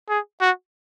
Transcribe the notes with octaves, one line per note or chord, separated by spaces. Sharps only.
G#4
F#4